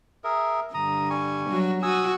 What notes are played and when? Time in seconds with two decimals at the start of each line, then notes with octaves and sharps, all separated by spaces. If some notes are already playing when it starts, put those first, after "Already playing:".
0.24 G#4 A#4 E5
0.74 G2 D3 A#5 D#6
1.10 G3 G#5 C#6
1.50 F#3 F#4
1.82 F#4 G#5 D#6 E6